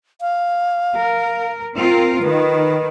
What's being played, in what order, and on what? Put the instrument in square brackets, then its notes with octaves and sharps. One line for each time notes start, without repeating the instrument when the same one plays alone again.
[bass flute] F5
[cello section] A#4
C4 F4 A#4
[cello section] D#3 [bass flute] B4